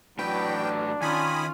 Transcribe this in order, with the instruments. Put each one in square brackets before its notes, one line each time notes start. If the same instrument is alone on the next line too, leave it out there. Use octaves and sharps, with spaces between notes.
[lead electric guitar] A2 B4 [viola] E3 F#3 [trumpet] D4 [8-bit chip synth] G5
[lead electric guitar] D#3 [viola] C#4 F4 [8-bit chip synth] G#5 B5 D#6